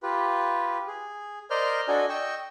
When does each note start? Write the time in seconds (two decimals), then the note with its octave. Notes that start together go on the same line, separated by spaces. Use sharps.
0.03 F4 G4 B4
0.87 G#4
1.50 A#4 C5 D5 D#5 F6 G6
1.88 D4 F#4 A4 D5 D#5 G#5
2.09 D#5 G5 C#6 E6